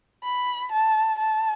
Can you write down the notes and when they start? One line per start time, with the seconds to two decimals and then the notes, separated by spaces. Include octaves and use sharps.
0.24 B5
0.72 A5
1.19 A5